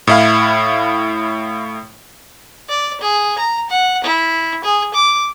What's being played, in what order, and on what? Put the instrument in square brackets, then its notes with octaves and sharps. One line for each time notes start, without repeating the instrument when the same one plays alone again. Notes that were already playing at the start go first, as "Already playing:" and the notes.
[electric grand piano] A2 E4 F5
[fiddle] D5
G#4
A#5
F#5
E4
G#4
D6